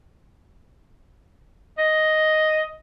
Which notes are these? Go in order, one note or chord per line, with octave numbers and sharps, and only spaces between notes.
D#5